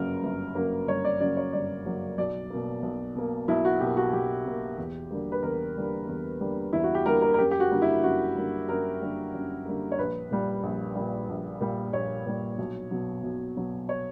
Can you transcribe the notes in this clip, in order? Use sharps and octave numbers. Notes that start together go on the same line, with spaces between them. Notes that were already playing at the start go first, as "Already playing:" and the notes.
Already playing: G1 F#2 C#3 F#3 A#3 A#4
G1
F#2 C#3 F#3 A#3
G1 C#5
D5
F#2 C#3 F#3 A#3 D5
C#5
G1 D5
F#2 C#3 F#3 A#3
B1 D5
B2 A#3
B1
B2 A#3
B1 E4
F#4
B2 A#3 G4
F#4
B1 G4
B2 A#3
E2
D3 G3 A#3
B4
E2 A#4
D3 G3 A#3
E2
D3 G3 A#3
E2 E4
F#4
G4
D3 G3 A#3 A#4
A#4
A#4
F#2 G4
G4
F#4
D3 G3 A#3
E4
F#2 F#4
D3 G3 A#3
F#2 A#4
D3 G3 A#3
F#2
D3 G3 A#3
C#5
A#1 B4
A#2 G3
A#1
A#2 G3
A#1
A#2 G3
A#1 C#5
A#2 G3
B1
B2 F#3
B1
B2 F#3
C#5